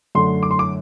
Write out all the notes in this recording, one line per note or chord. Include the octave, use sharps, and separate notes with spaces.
F#2 D3 A3 C6
D6
C6
D6